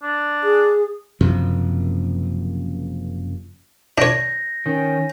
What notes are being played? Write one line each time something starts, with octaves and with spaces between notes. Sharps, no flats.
D4
G#4
F#1 F#2 C3 F3
D4 C#5 G6 A#6
D#3 C#4